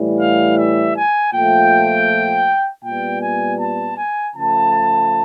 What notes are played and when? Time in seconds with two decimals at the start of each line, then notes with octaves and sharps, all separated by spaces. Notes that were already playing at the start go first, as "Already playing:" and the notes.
Already playing: A2 E3 G3
0.19 F5
0.57 E5
0.96 G#5
1.33 A#2 F3 A3 G5
2.83 A#2 G3 B3 G5
3.21 G#5
3.59 A5
3.97 G#5
4.35 C#3 F3 A3 A5